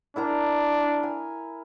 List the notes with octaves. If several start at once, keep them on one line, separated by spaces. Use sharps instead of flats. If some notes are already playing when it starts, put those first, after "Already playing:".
D4 E4 A#4 A#5
G#5